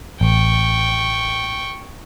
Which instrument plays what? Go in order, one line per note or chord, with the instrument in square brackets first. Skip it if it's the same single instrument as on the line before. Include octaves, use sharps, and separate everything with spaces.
[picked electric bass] A1 [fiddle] G5 C#6